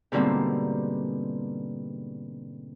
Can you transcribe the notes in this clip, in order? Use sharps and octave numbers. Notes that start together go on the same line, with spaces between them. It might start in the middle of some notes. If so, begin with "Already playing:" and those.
G#2 B2 D3 G3 A#3 C4